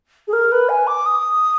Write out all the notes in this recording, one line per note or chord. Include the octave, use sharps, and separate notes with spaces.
G#4
A#4
B4
G#5
D6
D#6